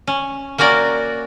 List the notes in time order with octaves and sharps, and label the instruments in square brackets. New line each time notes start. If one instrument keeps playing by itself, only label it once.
[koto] C#4
A#3 C#4 F#4 A#4 D5